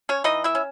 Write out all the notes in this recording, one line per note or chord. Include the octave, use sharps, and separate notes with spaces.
C#4 C#5
E3 D#4 D#5
E4 E5
C#4